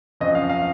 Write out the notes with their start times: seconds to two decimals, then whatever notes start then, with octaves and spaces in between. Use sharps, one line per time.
0.20 F#2 F3 C4 D#5
0.35 F5
0.49 F5